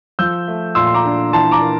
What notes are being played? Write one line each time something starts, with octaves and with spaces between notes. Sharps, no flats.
F3 E6 G6
A3
A#2 C6 E6
C6
A#5 D6
D4
E3 A5 C6
A#5 D6
A#3